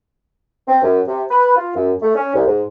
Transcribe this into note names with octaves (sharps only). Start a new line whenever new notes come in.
C4
F#2
C3
B4
F4
F#2
A3
C#4
C2
G#2